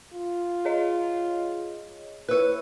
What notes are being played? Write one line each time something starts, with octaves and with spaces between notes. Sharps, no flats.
F4
G#4 C#5 D#5
E4 B4 C#5 E6 F#6